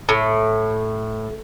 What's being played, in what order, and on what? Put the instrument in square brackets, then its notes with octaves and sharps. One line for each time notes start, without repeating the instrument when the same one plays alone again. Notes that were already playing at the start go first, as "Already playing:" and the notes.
[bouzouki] A2